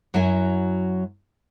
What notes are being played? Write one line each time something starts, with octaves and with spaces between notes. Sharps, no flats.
F#2 F#3 E4 F#4 G#5